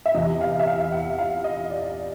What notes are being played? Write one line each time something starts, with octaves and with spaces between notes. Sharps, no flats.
E5
E2 C3 E3 D#5
F5
E5
F5
F#5
F5
D#5
D5